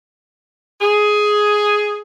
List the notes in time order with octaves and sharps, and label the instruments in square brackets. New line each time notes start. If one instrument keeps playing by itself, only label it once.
[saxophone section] G#4